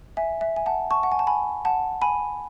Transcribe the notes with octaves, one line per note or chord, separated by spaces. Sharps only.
E5 G#5
E5
G#5
F#5 A5
A5 C#6
F#5
G#5
A5
G#5 B5
F#5 A5
G#5 B5